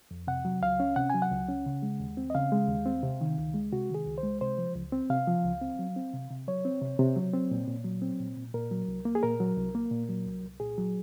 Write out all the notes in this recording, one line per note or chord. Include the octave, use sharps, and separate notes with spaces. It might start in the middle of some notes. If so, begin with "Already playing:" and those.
F2
C3 F#5
F#3
C#2 F5
C#4
C3 F#5
F#3 G#5
F#5
C#2
C#4
C#3
G#3
D#2
C4
D#5
C#3 F5
G#3
D#2
C4
C3
D#3
C#2
G#3
C3 F#4
D#3
G#4
C#2
C5
G#3
C3 C5
F3
C#2
C4
C3 F5
F3
C#2
C4
F#3
C4
C3
C3
F#3 C#5
C4
C3
C3
F#3
C4
A#2
A#2
F#3
C4
A#2
A#2
A#2 A#4
F#3
C2
A#3
G#4
A#2 A#4
F#3
C2
A#3
A#2
F#3
C2
C2
A#2 G#4
F#3